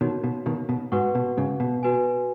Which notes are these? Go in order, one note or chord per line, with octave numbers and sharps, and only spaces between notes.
B2 D#3 D#4 F#4 C#5
B2
B2 D#3
B2
G#2 F#4 B4 F#5 C#6
B2
G#2 C#3
B2
F#4 B4 G#5